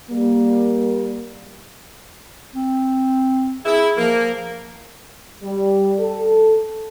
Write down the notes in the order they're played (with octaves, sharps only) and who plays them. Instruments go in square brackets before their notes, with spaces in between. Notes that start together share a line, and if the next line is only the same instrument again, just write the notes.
[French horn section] G3 A#3
[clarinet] C4
[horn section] E4 [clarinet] G#4
[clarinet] F3 [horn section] A#3
[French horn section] G3
A4